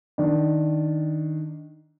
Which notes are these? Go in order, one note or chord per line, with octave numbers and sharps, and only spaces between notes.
D#3 D4